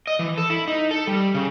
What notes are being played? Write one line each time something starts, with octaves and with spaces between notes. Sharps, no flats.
D#5
E3
A4
E4
D#4
A4
G3
C#3